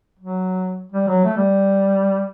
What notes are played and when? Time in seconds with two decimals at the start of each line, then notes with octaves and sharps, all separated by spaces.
0.19 F#3
0.92 G3
1.08 F#3
1.25 A3
1.37 G3